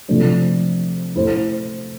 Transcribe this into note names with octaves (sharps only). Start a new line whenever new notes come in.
C3 F3 A3 D4
A3 E4 A4 C5